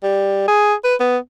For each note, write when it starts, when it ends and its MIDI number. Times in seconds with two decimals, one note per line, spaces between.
0.04 0.46 55
0.48 0.74 68
0.84 0.95 71
1.00 1.17 59